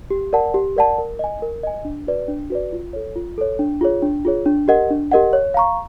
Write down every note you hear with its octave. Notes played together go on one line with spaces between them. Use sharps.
G4
A#4 D5 F#5 A5
G4
A#4 D5 F#5 A5
A#4
D#5 G#5
A#4
D#5 G#5
D4
F#4 B4 D5
D4
F#4 B4 D5
F4
A4 C#5
F4
A4 C#5
D4
F4 G#4 C#5
D4
F4 G#4 C#5
D4
G4 A#4 D#5 F#5
D4
G4 A#4 D#5 F#5
C#5
F5 A#5 C#6